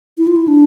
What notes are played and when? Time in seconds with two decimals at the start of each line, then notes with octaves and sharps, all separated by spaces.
0.18 E4
0.27 F4
0.36 E4
0.48 D4